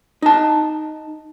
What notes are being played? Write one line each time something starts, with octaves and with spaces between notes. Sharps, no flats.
D#4 A5